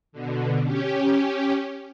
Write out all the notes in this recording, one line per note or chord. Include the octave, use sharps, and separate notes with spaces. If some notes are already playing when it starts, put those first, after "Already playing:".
B2 D3
C#4 G4